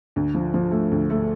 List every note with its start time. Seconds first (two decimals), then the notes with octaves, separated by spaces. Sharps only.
0.16 D2
0.34 F3
0.54 F3
0.72 A3
0.91 D2
1.10 A3